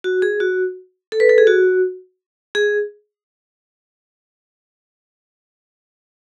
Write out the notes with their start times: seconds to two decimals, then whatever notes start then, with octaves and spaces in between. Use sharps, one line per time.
0.04 F#4
0.22 G#4
0.40 F#4
1.12 A4
1.20 B4
1.29 A4
1.38 G#4
1.47 F#4
2.55 G#4